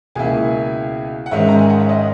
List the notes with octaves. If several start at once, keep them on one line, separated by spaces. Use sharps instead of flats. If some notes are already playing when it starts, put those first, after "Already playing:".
C#2 B2 A#3 E4 G#4 G#5
F#5
G#2 D#3 G#3 C#4 E5
A#5
G#5
F#5
E5
D#5